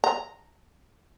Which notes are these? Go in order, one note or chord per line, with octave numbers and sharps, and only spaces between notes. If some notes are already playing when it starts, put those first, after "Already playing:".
A#5